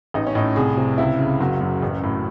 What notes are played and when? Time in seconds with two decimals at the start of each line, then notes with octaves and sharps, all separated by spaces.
0.14 A1 D#4
0.27 C#4
0.35 A2 D#4
0.56 C2 G#4
0.77 C3
0.98 C#2 E4
1.19 C#3
1.40 F#1 F#3
1.61 F#2
1.82 A1
2.03 A2